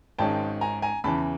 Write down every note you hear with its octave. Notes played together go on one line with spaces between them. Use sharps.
G#1 G#2 D#3 G#3 C#4 G5 A5
G#5 A#5
G#5 A#5
E2 C#3 E3 A5 B5